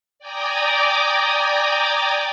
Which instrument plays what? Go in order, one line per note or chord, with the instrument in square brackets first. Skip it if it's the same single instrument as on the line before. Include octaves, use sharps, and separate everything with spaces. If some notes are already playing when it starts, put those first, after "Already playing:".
[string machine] D5 G5 G#5 A#5 D6 D#6